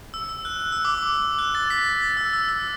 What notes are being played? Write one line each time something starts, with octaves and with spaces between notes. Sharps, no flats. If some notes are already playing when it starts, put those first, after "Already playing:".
E6
E6
F#6
F#6
E6
D6
E6
F#6
A6
B6
A6
E6
E6
E6